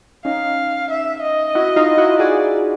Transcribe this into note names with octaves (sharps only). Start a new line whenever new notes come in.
C#4 D#4 F5
E5
D#5
E4 F#4
D#4 F4
E4 F#4
F#4 G#4 D5